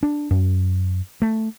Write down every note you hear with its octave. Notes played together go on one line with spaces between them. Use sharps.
D4
F#2
A3